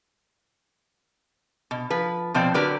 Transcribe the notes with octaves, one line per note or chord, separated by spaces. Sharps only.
B2
F3 B4
B2 F3 C4 C5 D5
D3 F#3 G4 A#4 B4 D5